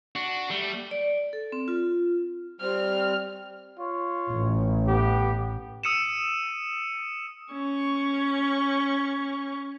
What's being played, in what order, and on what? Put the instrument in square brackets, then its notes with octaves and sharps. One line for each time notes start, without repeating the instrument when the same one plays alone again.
[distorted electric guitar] D4 [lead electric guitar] F#4
[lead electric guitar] G3 [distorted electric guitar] A3
[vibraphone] D5
A4
C4
F4
[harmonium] G3 C4 [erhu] F6
[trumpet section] F4 C#5
[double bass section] A1
[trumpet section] B3 G4
[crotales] D#6 E6 C#7 D#7 E7
[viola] C#4 C#6